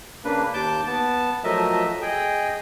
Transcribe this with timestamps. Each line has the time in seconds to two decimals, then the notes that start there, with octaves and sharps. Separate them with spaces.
0.24 C#3 A#3 D4 B4
0.54 D#2 A5 D6 G6
0.86 B3 A5
1.44 F3 F#3 A3 A#4 D#5 E5
2.02 G#4 D#5 G5